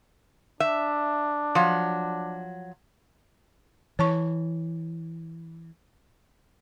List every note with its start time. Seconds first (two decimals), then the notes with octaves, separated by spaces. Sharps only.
0.60 D4 E5
1.55 F3 F#3
3.99 E3 C#5 A5 C#6